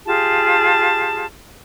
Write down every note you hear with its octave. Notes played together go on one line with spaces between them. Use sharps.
F4 G4 G#4 A5